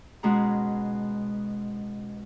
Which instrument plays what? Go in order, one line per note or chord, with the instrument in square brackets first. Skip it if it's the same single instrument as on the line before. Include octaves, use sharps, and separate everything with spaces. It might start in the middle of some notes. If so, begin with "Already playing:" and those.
[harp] B2 G#3 C#4 G#4 A#5